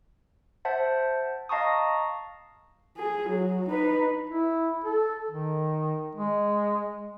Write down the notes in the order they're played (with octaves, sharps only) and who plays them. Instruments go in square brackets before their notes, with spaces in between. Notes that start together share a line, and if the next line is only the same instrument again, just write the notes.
[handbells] C5 E5 F#5 A5
D#5 F5 A5 A#5 C#6 D#6
[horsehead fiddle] G#4
F#3
D#4 B4
[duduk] E4
A4
D#3
G#3